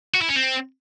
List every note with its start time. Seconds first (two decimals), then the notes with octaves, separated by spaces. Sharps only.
0.14 F#4
0.22 E4
0.29 C#4
0.36 C4